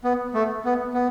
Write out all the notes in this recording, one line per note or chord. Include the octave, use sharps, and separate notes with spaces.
B3
A3
B3
B3